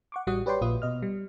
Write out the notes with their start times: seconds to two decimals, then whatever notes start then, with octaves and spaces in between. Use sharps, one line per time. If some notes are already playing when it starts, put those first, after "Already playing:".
0.12 F#5 C#6 D6
0.27 A1 G3 F#4 F#5 D#6
0.46 G4 B4 C#5 D5 G5 C6
0.61 A#1 A#2 F4 B4 D#6
0.82 B2 D#5 F6
1.02 G3